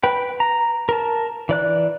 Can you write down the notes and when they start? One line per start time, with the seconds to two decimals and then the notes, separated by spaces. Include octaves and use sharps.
0.03 B4 G5
0.40 A#5
0.89 A#4 A5
1.49 E3 D5 F#6